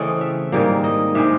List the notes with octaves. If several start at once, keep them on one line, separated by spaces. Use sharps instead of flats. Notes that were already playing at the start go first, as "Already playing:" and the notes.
Already playing: C#3 E3 A3 C4 D#5
E5
G#2 D#3 G3 A#3
D#5
C3 D#3 G#3 E5